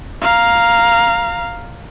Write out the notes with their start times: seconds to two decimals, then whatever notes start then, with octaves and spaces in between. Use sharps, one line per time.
0.22 F5 A#5